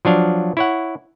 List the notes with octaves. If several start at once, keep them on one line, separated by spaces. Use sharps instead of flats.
F3 F#3 D4 F5
E4 C#5 F#5